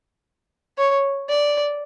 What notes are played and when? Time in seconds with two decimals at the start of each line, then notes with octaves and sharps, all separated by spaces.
0.78 C#5
1.29 D5